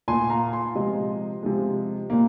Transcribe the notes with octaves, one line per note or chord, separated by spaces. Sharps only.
A#2 A#3 G#5 C6
F5 A#5
G#5 C6
C3 F3 G#3 D#5
C3 F3 G#3
A#2 A#3